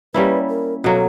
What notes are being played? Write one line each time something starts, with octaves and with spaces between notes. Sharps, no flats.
G3 A#3 C#4 E4 B4
A#4
B2 F#3 A#3 A4